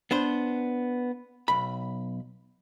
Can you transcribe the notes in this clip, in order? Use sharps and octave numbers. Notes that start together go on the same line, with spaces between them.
B3 D4 C5
B1 B5